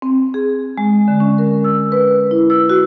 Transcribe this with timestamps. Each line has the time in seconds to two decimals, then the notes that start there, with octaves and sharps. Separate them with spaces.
0.02 C4
0.34 G#4
0.78 G#3
1.08 D3
1.20 C#4
1.38 A#4
1.64 E6
1.92 B4
2.31 E4
2.50 E6
2.70 F#4